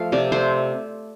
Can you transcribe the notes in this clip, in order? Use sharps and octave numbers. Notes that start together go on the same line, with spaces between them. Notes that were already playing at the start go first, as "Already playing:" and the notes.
Already playing: F3 A3 F5
C3 D5
A3 C5